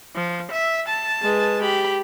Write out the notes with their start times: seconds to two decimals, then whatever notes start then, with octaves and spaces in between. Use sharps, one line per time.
0.15 F3
0.51 E5
0.88 A5
1.22 G#3 B4
1.62 G4 B5